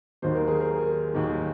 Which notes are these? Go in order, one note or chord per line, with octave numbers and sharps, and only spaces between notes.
D#2 D#3 F#3 C5
A#4
G#4
A#4
D#2 D#3 F#3